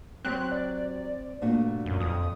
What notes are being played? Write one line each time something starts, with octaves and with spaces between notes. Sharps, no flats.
F#3 C4 G4 C#5 F#6
D5
G2 A#2 A3 F#4
F#2
F2 D#6